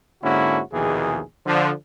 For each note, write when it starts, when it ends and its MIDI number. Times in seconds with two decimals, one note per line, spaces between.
0.23 0.61 44
0.23 0.61 50
0.23 0.61 58
0.23 0.61 61
0.23 0.61 64
0.23 0.61 66
0.72 1.21 34
0.72 1.21 39
0.72 1.21 47
0.72 1.21 52
0.72 1.21 68
1.46 1.72 50
1.46 1.72 53